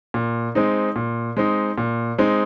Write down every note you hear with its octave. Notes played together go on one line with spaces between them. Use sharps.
A#2
G#3 C4 D#4
A#2
G#3 C4 D#4
A#2
G#3 C4 D#4